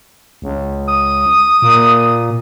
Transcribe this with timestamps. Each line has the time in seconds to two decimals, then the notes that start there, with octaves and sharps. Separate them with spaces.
0.42 C#2
0.88 D#6
1.62 A#2